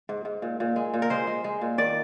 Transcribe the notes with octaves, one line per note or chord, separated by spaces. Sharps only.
G#2
G#2
A#2
A#2
G#3
A#2
A#4
G#3 C5
G#3
G#3
A#2
D#3 D5